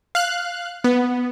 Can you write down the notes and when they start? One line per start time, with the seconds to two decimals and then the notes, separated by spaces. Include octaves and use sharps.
0.15 F5 F#6
0.84 B3